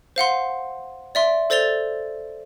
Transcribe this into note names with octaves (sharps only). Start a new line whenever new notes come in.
C5 F5 F#5 C6
D5 E5 C6
A4 C5 D5 A6 F7 G7